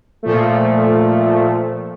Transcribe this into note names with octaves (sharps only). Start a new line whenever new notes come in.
A#2 F3 A3